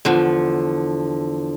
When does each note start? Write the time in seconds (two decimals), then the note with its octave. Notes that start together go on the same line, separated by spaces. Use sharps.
0.05 E2 D3 F3